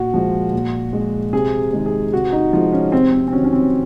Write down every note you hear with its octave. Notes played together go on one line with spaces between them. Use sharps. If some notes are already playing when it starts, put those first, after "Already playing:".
Already playing: A#2 F#4
F3 G#3
A#2
G#3
C3 G#4
D#3 G#3
G#4
C3 F#4
D#4
F3 G#3 F4
C#4
C3 C4
C4
C4
D#3 F#3 C#4
C#4
C4